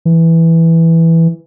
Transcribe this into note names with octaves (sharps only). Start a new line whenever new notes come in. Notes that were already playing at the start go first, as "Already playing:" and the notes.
E3